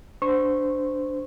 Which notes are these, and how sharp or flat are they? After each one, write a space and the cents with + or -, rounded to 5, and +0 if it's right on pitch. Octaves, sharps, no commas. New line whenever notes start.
D4 +0 C5 -20 C#6 -25